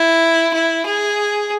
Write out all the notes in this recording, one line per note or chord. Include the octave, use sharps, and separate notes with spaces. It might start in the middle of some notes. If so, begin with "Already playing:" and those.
Already playing: E4
E4
G#4